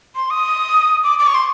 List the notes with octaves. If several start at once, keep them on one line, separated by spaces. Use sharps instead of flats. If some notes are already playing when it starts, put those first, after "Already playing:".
C6
D#6
D6
D6
C#6
C6